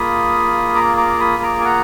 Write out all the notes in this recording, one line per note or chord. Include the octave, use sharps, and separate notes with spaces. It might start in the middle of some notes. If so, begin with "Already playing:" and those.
Already playing: A#3 F4 G#4 B5 D#6
A#5 D6
A#5 D6
B5 D#6
A#5 D6
G#5
F#5 A#5